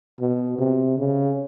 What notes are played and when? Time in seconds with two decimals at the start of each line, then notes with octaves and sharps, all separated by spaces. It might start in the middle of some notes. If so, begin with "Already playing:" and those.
0.20 B2
0.58 C3
0.98 C#3